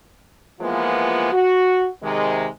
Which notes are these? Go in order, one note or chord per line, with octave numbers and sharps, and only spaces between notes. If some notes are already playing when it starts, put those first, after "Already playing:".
E3 F3 G#3 A#3 B3 F4
F#4
C3 D#3 G#3